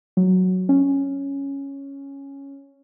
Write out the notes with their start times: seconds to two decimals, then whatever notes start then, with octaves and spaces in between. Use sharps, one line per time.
0.17 F#3
0.69 C#4